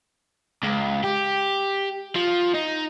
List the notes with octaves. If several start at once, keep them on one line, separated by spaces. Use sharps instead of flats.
C#2
G4
F3
D#4